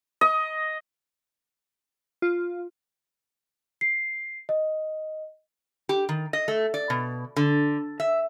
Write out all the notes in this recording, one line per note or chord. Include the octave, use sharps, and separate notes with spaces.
D#5
F4
C7
D#5
G4
D#3
D#5
A3
D5
B2
D3
E5